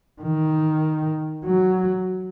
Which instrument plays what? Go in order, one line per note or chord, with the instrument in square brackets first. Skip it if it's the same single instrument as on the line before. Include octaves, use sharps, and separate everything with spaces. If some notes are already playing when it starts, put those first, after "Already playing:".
[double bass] D#3
F#3